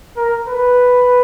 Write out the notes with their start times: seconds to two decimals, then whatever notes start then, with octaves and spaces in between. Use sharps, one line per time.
0.17 A#4
0.48 B4